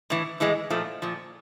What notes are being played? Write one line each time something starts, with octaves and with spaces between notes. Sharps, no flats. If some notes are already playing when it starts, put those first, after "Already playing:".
A2 E3
A2 E3 G#3
A#2 F3 A3
A#2 F3